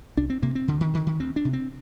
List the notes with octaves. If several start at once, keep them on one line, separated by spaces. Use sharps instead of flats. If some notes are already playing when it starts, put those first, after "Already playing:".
C2 D4
C4
C3 A#3
C4
D2 D3
D#3
D3 D#3
D#3
D2 C4
D4
C3
C4